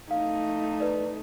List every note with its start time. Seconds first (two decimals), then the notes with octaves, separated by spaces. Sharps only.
0.11 A3 D#4 F5
0.80 B4 D5